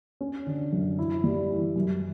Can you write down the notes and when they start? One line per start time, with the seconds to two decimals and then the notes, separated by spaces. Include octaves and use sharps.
0.21 C#4
0.47 D3
0.73 F#2
0.99 E4
1.24 G3
1.50 E3
1.76 F#2